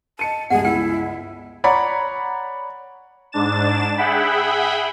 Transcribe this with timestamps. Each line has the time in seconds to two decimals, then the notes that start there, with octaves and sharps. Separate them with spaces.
0.19 D#5 A5 C#7 D#7
0.50 G1 C#2 G#4 F#5
0.65 E4 G5
1.64 C#5 D5 F#5 A#5 B5
3.32 G#2 D4 A6 E7
3.97 G#4 E5 F#5 G5 B5